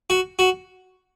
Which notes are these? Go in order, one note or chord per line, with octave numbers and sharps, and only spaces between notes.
F#4
F#4